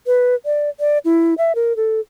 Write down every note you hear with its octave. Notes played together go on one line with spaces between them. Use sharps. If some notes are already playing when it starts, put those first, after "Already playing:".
B4
D5
D5
E4
E5
A#4
A4